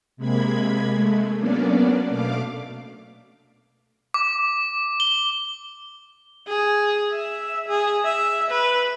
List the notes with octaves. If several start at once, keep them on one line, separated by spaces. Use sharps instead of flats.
C3 G#3 A#3 B5 G#6
G#3 A3
F#3 A#3 B3 C#4 D4 D5
B2 A3 F5 D6
D6
G7
G#4
E5
G#4
E5
B4